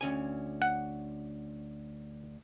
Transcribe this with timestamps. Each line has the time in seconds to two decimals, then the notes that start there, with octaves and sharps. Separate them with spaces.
0.01 D2 C#4 G#5
0.62 F#5